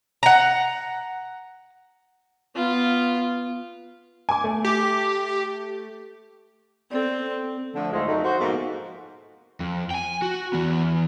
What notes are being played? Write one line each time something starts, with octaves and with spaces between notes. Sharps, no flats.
F#5 A#5
B3 F4
G#5 D6
A3
G4
C4 A4 D5
D3 F3 A3
D2 G#2 G#3 A3 C4 F4
F#2 A3 D#4
F#4 C5
G#2 B2 F3 A3 A#3 F#4
F2
G5 G#5
F#4
E3 B3